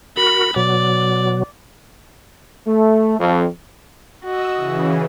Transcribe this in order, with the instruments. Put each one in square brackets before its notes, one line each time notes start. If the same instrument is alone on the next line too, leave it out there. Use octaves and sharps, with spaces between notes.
[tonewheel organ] F#4 A#4 [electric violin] B5
[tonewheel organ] B2 F#3 [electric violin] D5
[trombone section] A3
F2
[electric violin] F#4 [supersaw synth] D#5 E6
[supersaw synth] C#3 E3